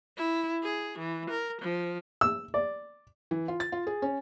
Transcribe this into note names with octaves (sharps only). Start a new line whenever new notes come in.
E4
G#4
E3
A#4
F3
E6
D5
E3
F4
A6
F4
G#4
C#4